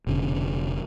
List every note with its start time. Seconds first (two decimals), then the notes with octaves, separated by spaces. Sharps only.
0.07 F1 B2 D3 C#4